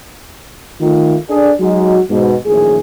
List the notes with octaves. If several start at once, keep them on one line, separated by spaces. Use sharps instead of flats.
D#3 A3 F4
D4 G#4 A4 D5
F#3 G#3 D#4 F#4
G#2 B2
A#1 F#2 A2 D#3 G#4